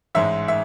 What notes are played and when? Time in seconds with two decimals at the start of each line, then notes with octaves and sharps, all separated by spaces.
0.15 A1 G#2 G#3 E5
0.48 E5